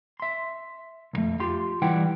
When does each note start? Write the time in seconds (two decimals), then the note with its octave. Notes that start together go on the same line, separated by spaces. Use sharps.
0.20 E5 C6
1.13 C2 F2 A3
1.40 F4 G4 C6
1.82 E3 G3 E4 B4 F#5 G5